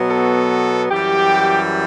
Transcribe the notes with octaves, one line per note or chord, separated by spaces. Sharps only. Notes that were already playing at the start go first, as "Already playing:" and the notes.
Already playing: B2 F#3 B3
A4
F#2 E3 G3 G4